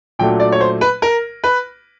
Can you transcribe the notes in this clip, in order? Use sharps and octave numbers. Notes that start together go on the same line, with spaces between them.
A#2 F#3 A3 D4 G5
D5
C#5
C5
B4
A#4
B4